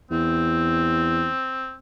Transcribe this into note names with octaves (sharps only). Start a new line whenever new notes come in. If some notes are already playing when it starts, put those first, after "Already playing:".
E2 C4